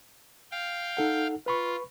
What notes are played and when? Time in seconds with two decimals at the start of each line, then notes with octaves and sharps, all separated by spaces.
0.51 F5 G5
0.97 D#4 A4 F#5
1.46 F4 B4 B5 C#6